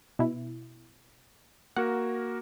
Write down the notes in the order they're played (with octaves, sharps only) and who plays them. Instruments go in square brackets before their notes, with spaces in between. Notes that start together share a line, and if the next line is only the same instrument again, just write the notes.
[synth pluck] B2 E4
[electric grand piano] A#3 F#4 A#4 [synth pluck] F#5